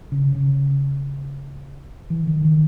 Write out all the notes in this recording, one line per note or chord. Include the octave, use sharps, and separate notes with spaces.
C#3
C#3
E3
D#3
D#3